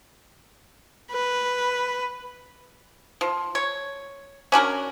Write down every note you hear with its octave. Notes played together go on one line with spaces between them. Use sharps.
B4
F3
C#5
C#4 D4 F#4 A#4